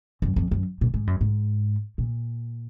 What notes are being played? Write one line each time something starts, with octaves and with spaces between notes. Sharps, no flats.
F#2
F2
F#2
A#2
G#2
F#2
G#2
A#2